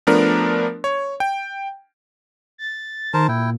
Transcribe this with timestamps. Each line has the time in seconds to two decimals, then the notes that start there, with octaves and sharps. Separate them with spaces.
0.07 F3 A3 B3 D4 A#4
0.84 C#5
1.20 G5
2.58 A6
3.14 D#3 A#4 C5 A5
3.28 A#2 E4 G5